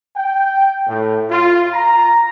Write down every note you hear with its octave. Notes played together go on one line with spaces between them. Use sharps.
G5
A2
F4
A#5